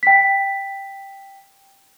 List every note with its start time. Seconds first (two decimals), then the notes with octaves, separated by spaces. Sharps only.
0.03 G5 B6